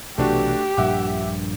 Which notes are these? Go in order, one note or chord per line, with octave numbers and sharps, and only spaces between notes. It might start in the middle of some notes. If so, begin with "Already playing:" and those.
B1 C3 E3 A3 D4 F#4 G4
A#1 G2 A#2 E5 F#5 D6